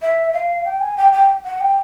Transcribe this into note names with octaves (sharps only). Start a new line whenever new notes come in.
E5
F5
G5
G#5
G5
G5
F#5
G5